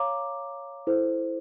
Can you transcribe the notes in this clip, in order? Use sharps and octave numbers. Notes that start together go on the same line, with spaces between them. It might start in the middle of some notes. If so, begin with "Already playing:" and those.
Already playing: C#5 F5 A#5 D6
E4 A4 C5